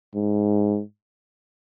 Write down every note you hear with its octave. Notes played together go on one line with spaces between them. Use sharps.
G#2